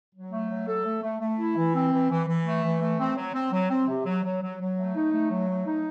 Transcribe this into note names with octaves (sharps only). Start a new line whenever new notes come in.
F#3
A3
F#3
A4
A3
A3
A3
E4
E3
C4
E3
E3
E3
A3
E3
A3
C4
F#3
C4
F#3
C4
C3
F#3
F#3
F#3
F#3
A3
D#4
A3
F#3
A3
D#4